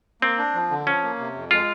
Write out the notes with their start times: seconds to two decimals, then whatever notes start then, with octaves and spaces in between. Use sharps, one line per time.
0.21 A#3 C4
0.38 D4
0.54 F3
0.71 D3
0.86 F3 C#4
1.03 A#3
1.19 C3
1.35 F2
1.51 G#3 F4